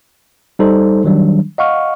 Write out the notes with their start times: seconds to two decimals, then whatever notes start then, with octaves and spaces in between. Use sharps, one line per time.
0.59 G3 D#4 A4 C5
1.04 D#3 F#3 G3 D4
1.58 D#5 F5 F#5 C#6 F6